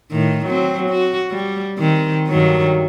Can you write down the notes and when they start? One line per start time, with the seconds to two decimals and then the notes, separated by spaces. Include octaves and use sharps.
0.12 A2 D#3
0.45 F#3 C4
0.90 F#4
1.31 G3
1.78 D#3 C4
2.27 G2 D#3 F#3